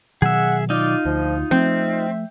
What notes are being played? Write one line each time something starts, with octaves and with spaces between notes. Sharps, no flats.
B2 D#3 F#3 G#4 E5 F#5
D#4 F4 D5
D2 F3
F3 A3 C4 E5